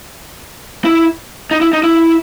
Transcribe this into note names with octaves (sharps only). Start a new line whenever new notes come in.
E4
D#4
E4
D#4
E4